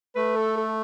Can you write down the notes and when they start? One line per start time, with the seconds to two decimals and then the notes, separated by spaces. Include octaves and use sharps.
0.15 A3 B4
0.36 A4
0.57 A4